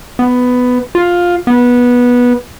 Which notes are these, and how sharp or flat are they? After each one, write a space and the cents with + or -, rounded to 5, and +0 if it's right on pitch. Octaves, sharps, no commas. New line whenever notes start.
B3 +10
F4 +10
B3 -15